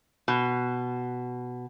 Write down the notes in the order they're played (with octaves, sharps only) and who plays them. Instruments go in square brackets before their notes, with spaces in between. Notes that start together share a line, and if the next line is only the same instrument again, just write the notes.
[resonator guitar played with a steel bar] B2